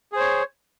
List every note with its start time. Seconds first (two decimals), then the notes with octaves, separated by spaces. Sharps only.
0.13 G#4
0.16 C5
0.20 C#5